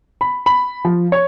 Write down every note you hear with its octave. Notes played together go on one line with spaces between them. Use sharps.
B5
B5
F3
C#5